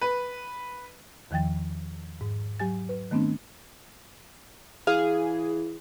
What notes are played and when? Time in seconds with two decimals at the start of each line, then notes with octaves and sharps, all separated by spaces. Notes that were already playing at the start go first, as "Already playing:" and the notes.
0.01 B4
1.31 E2 D#3 F3 G5 A6
2.21 G#2
2.60 F#3 G4 G#5 A6
2.89 B4
3.11 D#3 A3 B3 C4 D4
4.87 E3 G#4 F5